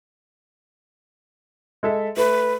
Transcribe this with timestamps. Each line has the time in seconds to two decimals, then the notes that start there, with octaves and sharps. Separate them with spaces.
1.83 G#3 A4 E5
2.17 A3 B4